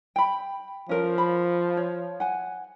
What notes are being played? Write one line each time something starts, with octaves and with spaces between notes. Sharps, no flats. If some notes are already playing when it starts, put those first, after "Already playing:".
G5 B5
F3 C#4 A#4 C5
B5
C#5
F#5 G#5